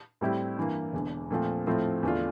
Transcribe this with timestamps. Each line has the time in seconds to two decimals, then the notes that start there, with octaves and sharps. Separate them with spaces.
0.21 A2 G3 C4 E4 G4
0.57 G2 E3 A#3
0.93 E1 E2 D3
1.31 A#2 F3 A3 C4 F4
1.67 A2 F3 A3 C4 F4
2.03 E2 D3 A3 D4 F4